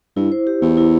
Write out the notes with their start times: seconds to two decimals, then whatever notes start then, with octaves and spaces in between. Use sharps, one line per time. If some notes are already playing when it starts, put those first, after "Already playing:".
0.16 G2 E4
0.32 C5
0.47 G4
0.62 E2 E4
0.77 E4